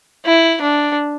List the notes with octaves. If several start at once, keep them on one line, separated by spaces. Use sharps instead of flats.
E4
D4